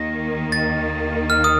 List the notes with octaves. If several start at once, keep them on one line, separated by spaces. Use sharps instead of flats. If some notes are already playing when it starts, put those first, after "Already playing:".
Already playing: D#2 D#3 A#3 A#6
A6
F6
D#6